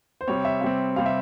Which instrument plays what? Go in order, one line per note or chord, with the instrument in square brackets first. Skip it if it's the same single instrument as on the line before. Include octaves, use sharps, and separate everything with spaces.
[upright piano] C5
C3 G3 C4 C#5
E5
C3 G3 C4 E5
C3 G3 C4 F5
E5